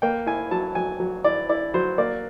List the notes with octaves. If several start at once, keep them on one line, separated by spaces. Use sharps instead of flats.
A#3 G5
E4 G#5
F#3 A5
F#3 G#5
F#3
E4 D5
E4 D5
F#3 C5
A#3 D5